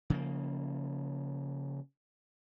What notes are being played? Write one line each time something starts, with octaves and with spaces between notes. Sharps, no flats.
C#3 F3 A#3